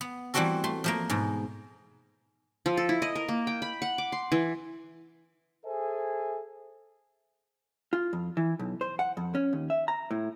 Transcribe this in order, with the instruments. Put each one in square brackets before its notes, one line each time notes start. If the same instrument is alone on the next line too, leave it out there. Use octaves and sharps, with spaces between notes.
[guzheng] B3
E3 G3 A3 C4 F#4 A4
A3 C6
F3 A3 A#3
G#2 B2
[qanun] F3
A4
E4
D#5
A#4
A#3
G5
B5
F#5
D6
C6
E3
[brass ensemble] G#4 A4 C5 E5 G#5
[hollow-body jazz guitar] F4
F2
E3
B1
C5
F#5
F2
C#4
D#2
E5
A#5
A2